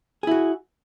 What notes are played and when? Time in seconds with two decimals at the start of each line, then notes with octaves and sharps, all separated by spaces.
0.23 G#4
0.27 E4
0.31 F#4